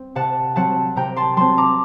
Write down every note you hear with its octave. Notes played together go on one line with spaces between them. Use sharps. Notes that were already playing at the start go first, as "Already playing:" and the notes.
Already playing: C4
C3 F#5 A5
F#3 C4 F#5 A5
C3 G5 A#5
A5 C6
F#3 C4 A5 C6
A#5 D6